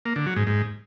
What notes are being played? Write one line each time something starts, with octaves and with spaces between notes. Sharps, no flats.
A#3
D3
F#3
G#2
G#2